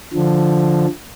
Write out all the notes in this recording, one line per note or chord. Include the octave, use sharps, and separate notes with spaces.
D3 F3